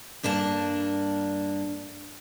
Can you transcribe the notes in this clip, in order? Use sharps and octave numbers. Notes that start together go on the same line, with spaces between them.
G2 A#3 D4 A5